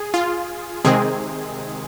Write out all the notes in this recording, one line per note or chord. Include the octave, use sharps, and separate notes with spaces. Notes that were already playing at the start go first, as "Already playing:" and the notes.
Already playing: G#4
F4
C3 D#3 G#3 C4 G#4